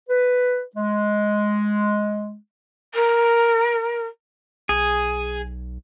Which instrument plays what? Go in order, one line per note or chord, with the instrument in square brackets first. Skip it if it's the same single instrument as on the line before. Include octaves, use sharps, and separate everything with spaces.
[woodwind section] B4
G#3
[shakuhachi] A#4
[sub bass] B1 [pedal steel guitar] G#4